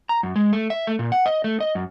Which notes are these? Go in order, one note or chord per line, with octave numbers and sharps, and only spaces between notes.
A#5
F#2
G#3
A3
E5
A3
A#2
F#5
D#5
A3
D#5
F#2